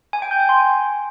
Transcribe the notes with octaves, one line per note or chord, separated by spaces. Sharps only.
G#5
G5
G6
G#5
C6